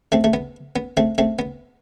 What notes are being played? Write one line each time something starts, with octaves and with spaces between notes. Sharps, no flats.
A3 C4
A3
B3
B3
A3 C4
A3 C4
B3